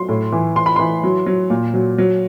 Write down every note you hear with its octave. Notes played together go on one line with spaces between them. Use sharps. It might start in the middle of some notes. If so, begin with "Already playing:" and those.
Already playing: F#3 C6
A2
E3
E3 C6
B5
E3 C6
F#3
F#3
A#2
F#3
F#3